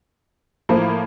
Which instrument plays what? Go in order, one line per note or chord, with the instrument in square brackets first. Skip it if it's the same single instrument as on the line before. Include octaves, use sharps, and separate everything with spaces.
[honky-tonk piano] A2 F3 A#3